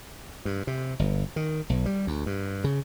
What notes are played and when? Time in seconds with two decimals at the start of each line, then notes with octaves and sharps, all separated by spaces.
0.45 G2
0.67 C3
0.99 G1
1.36 D#3
1.70 B1
1.86 G3
2.07 D2
2.26 G2
2.64 C#3